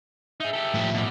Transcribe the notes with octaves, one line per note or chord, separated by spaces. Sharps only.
D#4 G#4 E5
G4 A4
A2 F3
B2 G3